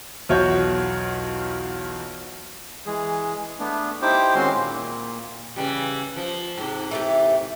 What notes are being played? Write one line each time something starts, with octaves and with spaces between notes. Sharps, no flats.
B1 E2 F4 F#4 C#5 G6
E3 G#3 G#4
A3 B3 D4
D#4 E4 G4 C5 G5 D6
D#3 G#3 C4 C#4 F#4 C6
A#2 A#3
C#3 E3 G3
F3
G#2 C3
E3 A3 G4